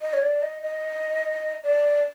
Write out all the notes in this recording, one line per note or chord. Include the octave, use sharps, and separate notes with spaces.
D#5
C#5
D5
D#5
D#5
D5